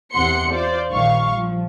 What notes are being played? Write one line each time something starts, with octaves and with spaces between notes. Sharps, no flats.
E2 C3 F#5 C6 C#7
F4 C5 D5
A#1 D#3 G3 F5 C#6
F3